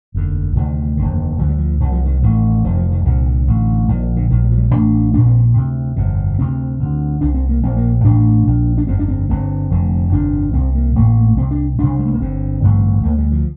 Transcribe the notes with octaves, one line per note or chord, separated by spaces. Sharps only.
F1 D#2 D3
D2 C3 D#3
F1 D#2 D3
D2 D3 F3
G3
F3
C2 C3 D#3
F3
D#3
A1 A2 D#3
F1 F2 C3 D#3
F3
D#3
C2 A#2 D3
A1 A2
A#1 A#2 D#3
D3
A#1 A#2 D#3
G3
F3
G3
A1 A2 D4
A#1 A#2 D4
C4
D2 C3
G1 F2 C3
D2 C3 C4
D2 D3
C2 C3 D4
C4
A#3
A#1 A#2 C4
A#3
A1 A2 D4
A#1 A#2
D4
G1 F2 D3 C4
D4
C4
G1 G2 D3 C4
F1 F2 D3
G1 F2 C3 D4
C2 C3 C4
A#3
A1 A2 A#3
C2 C3 C4
D4
C2 C3 D4
G3
A3
A#3
G1 G2 D3 C4
A1 G2 D3
D2 D3 A#3
G3
F3